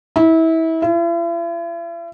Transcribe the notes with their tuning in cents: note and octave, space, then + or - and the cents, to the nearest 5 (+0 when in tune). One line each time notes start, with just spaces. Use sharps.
E4 -25
E4 +45